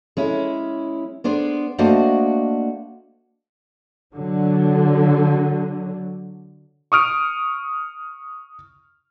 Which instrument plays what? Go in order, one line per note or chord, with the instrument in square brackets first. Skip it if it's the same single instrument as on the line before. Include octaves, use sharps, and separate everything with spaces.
[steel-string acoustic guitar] G#3 C#4 E4
G#3 B3 D4 C5
A3 A#3 D4 F#4 C5 D#5
[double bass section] D3 F#3
[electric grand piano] C#6 D#6 F6 D7